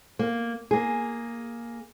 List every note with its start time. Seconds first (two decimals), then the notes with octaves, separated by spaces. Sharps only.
0.19 A#3
0.71 A#3 G#4